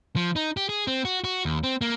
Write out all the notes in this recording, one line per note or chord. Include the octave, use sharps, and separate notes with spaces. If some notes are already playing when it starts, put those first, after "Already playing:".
F3
D#4
G4
G#4
C4
F#4
F#4
D#2
C4
A#3